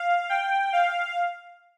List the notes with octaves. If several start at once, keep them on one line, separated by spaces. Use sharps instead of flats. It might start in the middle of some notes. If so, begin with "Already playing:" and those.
Already playing: F5
G5
F5